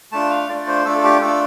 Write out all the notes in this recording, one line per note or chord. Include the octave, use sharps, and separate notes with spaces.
A3 D4 F4 A5
F5
A3 D4 F4 D5
C5
A3 D4 F4 A4
A4
G4
A3 D4 F4 A4